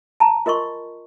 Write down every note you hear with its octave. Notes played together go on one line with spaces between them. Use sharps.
A5 A#5
F4 A#4 D#5 C6 C#6